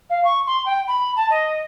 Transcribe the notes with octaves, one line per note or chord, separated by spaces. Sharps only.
F5
C#6
C6
G5
B5
A5
D#5